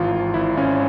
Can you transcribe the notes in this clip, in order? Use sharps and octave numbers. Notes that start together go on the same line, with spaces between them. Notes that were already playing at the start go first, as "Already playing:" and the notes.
Already playing: G#1 E3 F4
G#1
G#1 E4
G#1 C#4